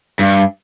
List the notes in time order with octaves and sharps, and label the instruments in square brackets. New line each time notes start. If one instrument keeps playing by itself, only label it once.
[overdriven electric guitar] G2